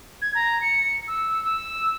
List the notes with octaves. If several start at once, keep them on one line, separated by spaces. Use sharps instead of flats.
G#6
A#5
C#7
E6
E6